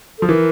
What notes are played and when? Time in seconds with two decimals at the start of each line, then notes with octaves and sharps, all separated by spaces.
0.19 F3 A4
0.29 E3 A#4